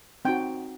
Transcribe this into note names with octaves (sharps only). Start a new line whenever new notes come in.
C4 D#4 F#4 G5